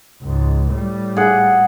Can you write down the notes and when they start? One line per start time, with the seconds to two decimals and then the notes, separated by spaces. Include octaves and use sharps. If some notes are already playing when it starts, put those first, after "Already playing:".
0.21 C#2 G#2
0.71 A2 G3
1.17 G#4 F#5